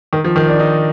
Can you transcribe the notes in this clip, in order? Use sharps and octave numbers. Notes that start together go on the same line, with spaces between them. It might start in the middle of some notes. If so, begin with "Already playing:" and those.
D#3
F3
D#3
D4
D#4